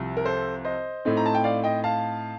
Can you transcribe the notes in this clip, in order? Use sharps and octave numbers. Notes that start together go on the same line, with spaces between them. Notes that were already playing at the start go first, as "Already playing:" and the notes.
Already playing: C2 C3 F3
A#4
A4 C5
C5 D#5
A2 A3 C4 D#4
A#5
A5
G5
D5 F5
D#5 G5
F5 A5